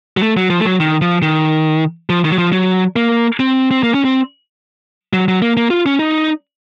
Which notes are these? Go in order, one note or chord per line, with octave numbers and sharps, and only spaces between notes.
F#3
A3
F#3
F3
A3
F#3
D#3
F3
D#3
F3
D#3
F#3
F3
F#3
A#3
C4
C4
A#3
C#4
C4
F#3
F#3
A#3
A#3
F4
C#4
D#4